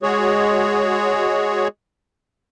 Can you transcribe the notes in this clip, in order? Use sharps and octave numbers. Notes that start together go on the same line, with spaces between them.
G#3 F#4 G#4 C#5